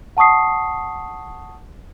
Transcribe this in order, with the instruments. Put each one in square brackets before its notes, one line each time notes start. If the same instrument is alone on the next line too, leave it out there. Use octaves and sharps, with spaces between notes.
[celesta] F#5 A5 C#6 D#6 C7